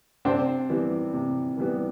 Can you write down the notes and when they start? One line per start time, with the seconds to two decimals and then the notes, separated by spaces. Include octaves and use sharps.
0.25 C3 C4 D4
0.69 E3 G3 B3
1.14 C3
1.57 E3 G3 B3